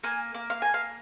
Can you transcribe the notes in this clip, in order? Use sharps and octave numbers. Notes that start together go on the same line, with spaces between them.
A#3 G#5
A#3
F5
A#3 G#5
F5